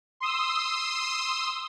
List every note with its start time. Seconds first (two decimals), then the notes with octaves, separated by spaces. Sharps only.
0.20 C6 D#6 E6